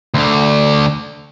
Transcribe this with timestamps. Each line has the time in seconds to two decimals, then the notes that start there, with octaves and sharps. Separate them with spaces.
0.14 D2 D3